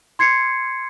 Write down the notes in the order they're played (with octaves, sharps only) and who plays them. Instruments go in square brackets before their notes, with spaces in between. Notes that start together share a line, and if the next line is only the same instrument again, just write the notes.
[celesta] C6 G#6 C7 C#7